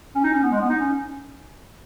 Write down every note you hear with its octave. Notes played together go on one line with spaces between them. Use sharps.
C#4
D#4
C#4
B3
G#3
B3
D#4
C#4